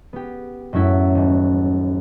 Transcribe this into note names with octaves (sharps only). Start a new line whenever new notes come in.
B3 G4
F#2 A2 C#4 E4 B6
D#1